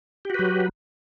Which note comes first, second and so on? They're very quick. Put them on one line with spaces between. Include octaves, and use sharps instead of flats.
G4 F#4 B4 F#3